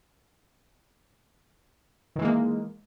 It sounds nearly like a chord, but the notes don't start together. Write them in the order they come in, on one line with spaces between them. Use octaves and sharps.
D#3 E3 G#3 A#3